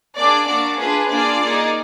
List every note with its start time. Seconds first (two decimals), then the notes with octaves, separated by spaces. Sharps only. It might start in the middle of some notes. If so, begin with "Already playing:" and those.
0.16 A#3 D4 G#4 D5
0.47 A#3 D4 F#4 D5
0.78 D4 F4 G#4 B4
1.09 A#3 D4 F4 G#4 D5
1.40 A#3 D#4 G#4